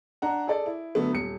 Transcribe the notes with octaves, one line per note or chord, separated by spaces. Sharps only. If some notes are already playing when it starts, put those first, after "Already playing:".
D4 F#5 A#5
G#4 A4 D5
E4
D3 F#3 A3 B3
D#1 C#7